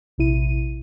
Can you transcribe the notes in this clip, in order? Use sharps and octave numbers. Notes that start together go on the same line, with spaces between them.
A#1 C3 E4 D#7